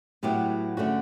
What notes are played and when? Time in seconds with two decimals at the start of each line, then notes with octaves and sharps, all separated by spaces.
0.23 A2 F#3 B3 E4 G4
0.77 D3 A3 C#4 F#4